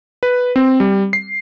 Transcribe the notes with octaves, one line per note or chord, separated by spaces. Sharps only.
B4
C4
G3
C7